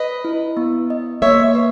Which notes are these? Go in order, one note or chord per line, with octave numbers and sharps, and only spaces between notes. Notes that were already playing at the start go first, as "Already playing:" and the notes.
Already playing: B4 D#5
E4
B3
D#5
A#3 C#5 E5
B4